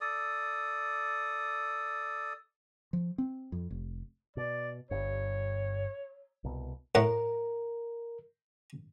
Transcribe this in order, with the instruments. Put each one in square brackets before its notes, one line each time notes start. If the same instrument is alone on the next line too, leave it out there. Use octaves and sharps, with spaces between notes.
[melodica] A4 D5 D#6
[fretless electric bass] F3
C4
F2
F1
[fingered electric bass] B2 [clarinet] D5
[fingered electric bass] G1 G2 [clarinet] C#5
[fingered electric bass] C2 B2
[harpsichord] A2 F#5 [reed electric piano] A#4